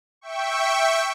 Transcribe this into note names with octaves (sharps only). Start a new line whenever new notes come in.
E5 G5 C#6